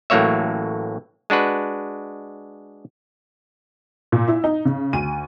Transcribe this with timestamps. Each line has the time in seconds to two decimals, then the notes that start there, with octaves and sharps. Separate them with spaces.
0.10 A1 A2 F#3 A#3 C#5 E5
1.30 G#3 D4 F#4 B4
4.12 A#2
4.28 E4
4.44 D#4
4.65 C#3
4.93 D2 D#7